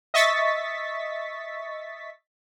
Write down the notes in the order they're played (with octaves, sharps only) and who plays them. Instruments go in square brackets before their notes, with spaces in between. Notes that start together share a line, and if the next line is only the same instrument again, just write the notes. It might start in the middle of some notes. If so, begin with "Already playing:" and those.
[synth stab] D#5 E5 C#6 A6 B6